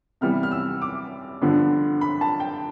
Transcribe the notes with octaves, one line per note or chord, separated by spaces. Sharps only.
C3 E3 G3 B3 F6
F6
E6
D6
G2 D3 F3 B3 D4
B5
A5
G5